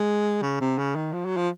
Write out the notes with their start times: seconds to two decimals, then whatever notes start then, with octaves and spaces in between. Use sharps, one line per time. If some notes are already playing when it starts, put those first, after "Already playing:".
Already playing: G#3
0.42 C#3
0.60 C3
0.78 C#3
0.95 D#3
1.13 F3
1.25 F#3
1.37 F3